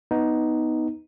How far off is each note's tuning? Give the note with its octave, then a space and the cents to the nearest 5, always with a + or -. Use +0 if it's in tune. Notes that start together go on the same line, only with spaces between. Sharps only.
B3 +0 D#4 +5